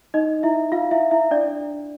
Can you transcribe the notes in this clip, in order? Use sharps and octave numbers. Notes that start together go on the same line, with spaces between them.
D#4 D#5
E4 E5
F4 F5
E4 E5
E4 E5
D4 D5